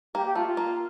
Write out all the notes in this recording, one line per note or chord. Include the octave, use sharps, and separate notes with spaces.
A#3 G4
G4
A3 F4
F4
A#3